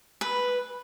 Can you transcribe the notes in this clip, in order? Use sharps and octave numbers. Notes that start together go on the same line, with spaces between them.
B4